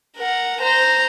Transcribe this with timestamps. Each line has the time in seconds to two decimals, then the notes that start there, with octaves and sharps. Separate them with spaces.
0.16 A#4 F#5
0.61 C5 A#5